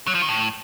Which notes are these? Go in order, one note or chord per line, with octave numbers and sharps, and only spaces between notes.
F#3
F3
D#3
A2